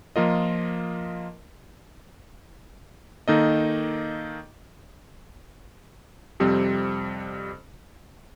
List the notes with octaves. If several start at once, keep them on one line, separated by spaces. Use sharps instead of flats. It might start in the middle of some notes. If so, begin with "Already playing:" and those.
F3 A#3 F4 A#4 D#5
D#3 A#3 D#4 A4 D#5
F2 C3 G3 C4